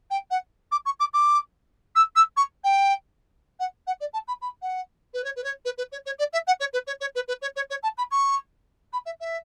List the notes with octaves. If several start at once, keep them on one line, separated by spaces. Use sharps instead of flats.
G5
F#5
D6
C#6
D6
D6
E6
E6
C#6
G5
F#5
F#5
D5
A5
B5
B5
F#5
B4
C#5
B4
C#5
B4
B4
C#5
C#5
D5
E5
F#5
C#5
B4
C#5
C#5
B4
B4
C#5
C#5
C#5
A5
B5
C#6
B5
E5
E5